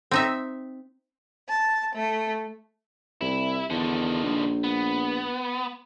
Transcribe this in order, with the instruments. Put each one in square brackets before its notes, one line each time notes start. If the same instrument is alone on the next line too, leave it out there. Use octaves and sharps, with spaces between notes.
[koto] C4 D#4 E5
[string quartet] A5
A3
[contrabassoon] C2 [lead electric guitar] E4
[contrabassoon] E2 [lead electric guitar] D3 D#3
[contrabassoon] A#1
[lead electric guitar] B3